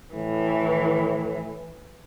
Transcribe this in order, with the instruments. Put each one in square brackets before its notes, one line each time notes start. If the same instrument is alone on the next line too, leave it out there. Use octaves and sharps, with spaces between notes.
[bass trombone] A2 [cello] E3